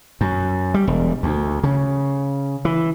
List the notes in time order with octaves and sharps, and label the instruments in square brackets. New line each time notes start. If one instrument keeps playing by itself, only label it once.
[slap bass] F#2
G3
E1
D2
C#3
E3